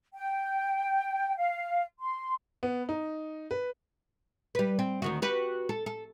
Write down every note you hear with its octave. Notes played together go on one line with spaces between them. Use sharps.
G5
F5
C6
B3
D#4
B4
G3 B4
C4
D2 D#3 F#4
F#4 G4 B4
A4
A4